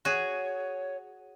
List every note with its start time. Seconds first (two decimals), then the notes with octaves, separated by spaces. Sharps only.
0.05 F#4 G#4 C#5